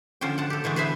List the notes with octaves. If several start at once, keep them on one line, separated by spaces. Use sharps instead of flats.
D3 F3 C#4 C5 G5
F#5 A5
G4 A4
D3 E3 G#3 A3
G#4 B4 C5 E5 G#5